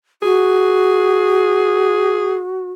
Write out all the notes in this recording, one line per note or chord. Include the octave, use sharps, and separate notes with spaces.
F#4 G#4